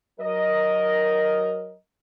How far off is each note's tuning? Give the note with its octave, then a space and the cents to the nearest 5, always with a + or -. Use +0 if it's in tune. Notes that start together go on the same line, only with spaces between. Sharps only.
F#3 +0 A#4 +5 D#5 +0